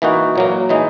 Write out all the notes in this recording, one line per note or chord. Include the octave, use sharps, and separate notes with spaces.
E3 A#3 D#4 F#4
A#2 F#3 A#3
E3 G#3 D#4